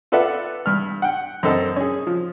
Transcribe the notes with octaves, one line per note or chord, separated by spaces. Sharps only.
F4 A4 B4 D5 E5 F#5
G2 F6
F#5 G5
F#2 C4 A4 D#5
C#4 G#4
F3